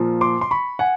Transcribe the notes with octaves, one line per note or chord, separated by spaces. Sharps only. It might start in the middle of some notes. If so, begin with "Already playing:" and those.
Already playing: A#2 F3
C6 D6
C6
B5 C#6
F#5 G#5